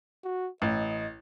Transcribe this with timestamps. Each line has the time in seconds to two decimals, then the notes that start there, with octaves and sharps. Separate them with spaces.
0.24 F#4
0.62 A1 D#5